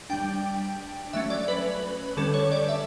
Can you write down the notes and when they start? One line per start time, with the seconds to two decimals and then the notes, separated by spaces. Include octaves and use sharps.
0.10 G3 D4 G5
1.13 F#3 A3 C#4 E5
1.30 D5
1.48 B4
2.17 D3 G3 C#4 A4
2.34 C#5
2.52 D5
2.69 E5